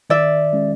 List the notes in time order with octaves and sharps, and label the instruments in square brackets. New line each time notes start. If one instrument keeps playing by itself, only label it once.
[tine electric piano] D#3 [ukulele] D5 E5
[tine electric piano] G#3 C#4